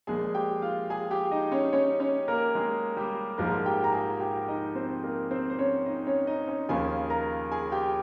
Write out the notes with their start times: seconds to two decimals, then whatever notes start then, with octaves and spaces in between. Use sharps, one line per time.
0.07 A#1 A#2 G#3 G#4 G#5
0.35 G4 G5
0.62 F4 F5
0.90 G#4 G#5
1.11 G4 G5
1.31 D#4 D#5
1.52 C#4 C#5
1.73 C#4 C#5
2.00 C#4 C#5
2.28 A#3 A#4
2.55 G#3 G#4
2.97 G3 G4
3.38 A#1 G#2 F3 G#3 A#3 A#4
3.66 G4 G5
3.84 A#5
3.93 G#4 G#5
4.20 G4 G5
4.48 D#4 D#5
4.75 C4 C5
5.03 A#3 A#4
5.31 C4 C5
5.50 C5
5.58 C#4 C#5
5.86 D#4 D#5
6.07 C#4 C#5
6.27 D#4 D#5
6.48 C#4 C#5
6.69 D#2 C#3 F3 G#4 G#5
7.10 A#4 A#5
7.52 G#4 G#5
7.72 G4 G5